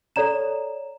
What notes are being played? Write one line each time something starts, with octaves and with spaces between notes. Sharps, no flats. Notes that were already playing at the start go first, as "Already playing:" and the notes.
A4 C#5 D5 A#5 E7